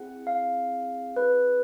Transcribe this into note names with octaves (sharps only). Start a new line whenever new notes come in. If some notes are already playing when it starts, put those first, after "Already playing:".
Already playing: C4 E4 G#4 F#5
F5
B4